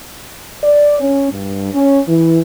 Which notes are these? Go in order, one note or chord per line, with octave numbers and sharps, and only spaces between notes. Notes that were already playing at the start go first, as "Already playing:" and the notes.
D5
C#4
G2
C#4
E3